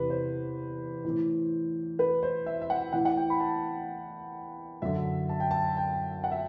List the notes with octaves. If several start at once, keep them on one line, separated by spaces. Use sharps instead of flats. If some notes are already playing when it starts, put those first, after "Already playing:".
Already playing: E2 C3 E3 B4
C5
A2 E3
B4
C5
E5
E5
F#5
A2 E3 F#5
F#5
G5
B5
A5
F#2 D3 E5
A5
G5
A5
G5
F#5
E5